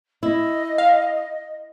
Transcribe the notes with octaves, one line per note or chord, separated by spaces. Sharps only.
E4 D#5
F5